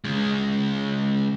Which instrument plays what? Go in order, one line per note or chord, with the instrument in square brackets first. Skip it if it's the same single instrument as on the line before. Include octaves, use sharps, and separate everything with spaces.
[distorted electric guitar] C#3 G#3